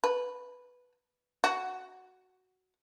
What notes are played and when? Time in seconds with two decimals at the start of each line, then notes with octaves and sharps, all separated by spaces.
0.04 B4
1.44 F#4